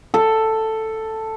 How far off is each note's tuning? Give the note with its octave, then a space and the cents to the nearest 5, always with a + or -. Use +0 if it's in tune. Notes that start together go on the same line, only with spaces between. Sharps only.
A4 +5